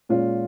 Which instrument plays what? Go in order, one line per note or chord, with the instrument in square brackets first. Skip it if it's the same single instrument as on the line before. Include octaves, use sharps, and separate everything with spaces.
[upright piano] A#2 G#3 C#4 F4